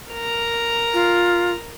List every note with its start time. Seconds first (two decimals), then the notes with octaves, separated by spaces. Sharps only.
0.11 A#4 A#5
0.94 F4